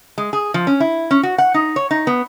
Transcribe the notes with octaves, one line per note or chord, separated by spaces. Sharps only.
G#3
G#4
F3
C#4
E4
C#4
F#4
F#5
D#4
C#5
D#4
B3